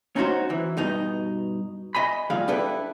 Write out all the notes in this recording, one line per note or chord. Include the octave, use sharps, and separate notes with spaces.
C#4 D#4 E4 F#4 C5
E3
G2 B2 D#4
D#5 G#5 B5
A#2 F3 G3 G#3 G#4 F5
D4 E4 G4 A4 B4